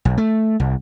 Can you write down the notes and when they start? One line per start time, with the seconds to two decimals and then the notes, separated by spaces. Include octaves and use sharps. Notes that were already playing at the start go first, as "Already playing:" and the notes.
0.05 B1
0.18 A3
0.60 C2